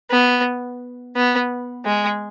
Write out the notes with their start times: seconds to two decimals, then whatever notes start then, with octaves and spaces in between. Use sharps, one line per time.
0.10 B3
1.16 B3
1.85 G#3